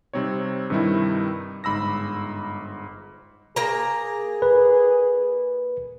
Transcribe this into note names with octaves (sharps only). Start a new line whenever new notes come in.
C3 G3 C4 D#4 C#5
G2 C3 D#3 G3 D#4 E4
G1 G#2 B5 E6 A#6
A#3 G#4 A#5
B4